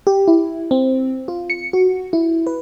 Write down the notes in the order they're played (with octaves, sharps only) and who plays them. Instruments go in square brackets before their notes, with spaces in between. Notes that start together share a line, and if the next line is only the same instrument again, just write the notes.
[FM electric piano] G4
E4
C4
F4
C#7
F#4
E4
B4